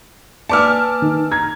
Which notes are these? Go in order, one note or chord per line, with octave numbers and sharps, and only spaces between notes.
A#3 B4 D5 G#5 A5 D6 E6 F6
D#3
A#5 G#6